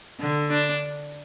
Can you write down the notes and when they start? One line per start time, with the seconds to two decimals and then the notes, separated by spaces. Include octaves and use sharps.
0.20 D3
0.51 D4